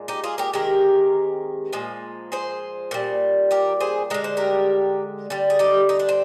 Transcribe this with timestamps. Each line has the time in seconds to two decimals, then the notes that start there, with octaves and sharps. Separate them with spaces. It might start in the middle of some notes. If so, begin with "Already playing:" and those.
Already playing: A#2 G#3
0.08 D#4 G4
0.24 F4 G#4
0.38 G4 A#4
0.53 C3 D#3 G#3 G4 A#4
1.73 A#2 F3 G#3
2.32 G#4 C5
2.91 A#2 G3
3.51 G4 A#4
3.80 G#4 C5
4.10 D3 G#3 A#4
4.24 C5
4.37 G4 A#4
5.30 D3 G3
5.50 G#4
5.59 D#4 G4
5.89 D#4
5.99 D4
6.09 C4